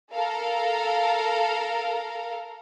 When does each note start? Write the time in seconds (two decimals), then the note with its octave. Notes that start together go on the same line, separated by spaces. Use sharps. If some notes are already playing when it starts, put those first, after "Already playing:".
0.14 A4 A#4 F5 A#5